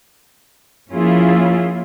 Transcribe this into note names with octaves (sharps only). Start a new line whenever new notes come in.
F3 A#3 C#4 E4 F4 G#4